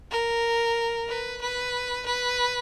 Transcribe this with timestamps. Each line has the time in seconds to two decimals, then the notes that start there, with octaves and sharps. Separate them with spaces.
0.11 A#4
1.08 B4
1.41 B4
2.06 B4